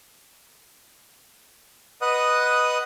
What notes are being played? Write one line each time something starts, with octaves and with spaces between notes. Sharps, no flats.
B4 D#5 F#5 D#6